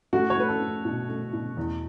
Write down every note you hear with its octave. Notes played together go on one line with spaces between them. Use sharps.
A3 F#4
C#5
A3 B4
A4
A3
B2
A3
B2
E2